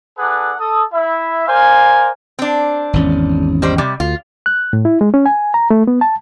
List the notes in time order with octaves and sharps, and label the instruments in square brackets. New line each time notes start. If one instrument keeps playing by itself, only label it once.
[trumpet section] D4 G#4 A4 B4 D5 F#5
A4 D#6
E4 E5
A#4 C5 D5 F5 G#5
[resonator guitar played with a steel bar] C4 D4
[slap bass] G#1 E2 C#4
[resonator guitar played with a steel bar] D#3 G3 C5
C3 G3
[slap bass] D2 [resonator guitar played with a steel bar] F4
[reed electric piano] F#6
A2
E4
G#3
C#4
G#5
A#5
A3
B3
A5